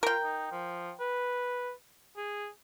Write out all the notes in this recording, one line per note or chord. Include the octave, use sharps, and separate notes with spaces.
F4 A#4 G5
D#4
F3
B4
G#4